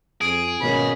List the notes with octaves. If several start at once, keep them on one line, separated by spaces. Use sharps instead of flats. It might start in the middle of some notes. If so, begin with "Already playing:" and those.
F2 G#4 D7
G#1 B2 A#3 C#4 B5